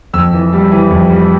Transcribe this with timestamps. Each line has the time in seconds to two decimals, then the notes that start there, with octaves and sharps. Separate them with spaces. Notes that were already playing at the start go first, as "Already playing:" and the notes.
0.13 F2 E6
0.33 E3
0.53 G3
0.71 E3
0.90 F2
1.10 G3